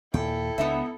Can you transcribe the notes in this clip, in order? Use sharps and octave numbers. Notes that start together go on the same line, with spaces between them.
D#2 A#2 E4 A4 G5
C#2 B3 D4 D#4 E5